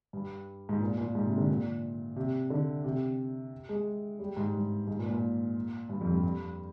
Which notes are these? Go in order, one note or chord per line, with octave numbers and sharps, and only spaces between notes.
G2
G#2
A#2
A#2
G#2
C3
D3
A#2
C3
D3
C3
G#3
G3
G#2
G2
G#2
A#2
A#2
G2
F2
G2
G2